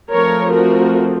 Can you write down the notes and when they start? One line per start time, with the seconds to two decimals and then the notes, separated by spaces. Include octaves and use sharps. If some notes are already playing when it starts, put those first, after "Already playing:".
0.11 F3 A3 C4 A#4 C#5
0.52 F#4 A#4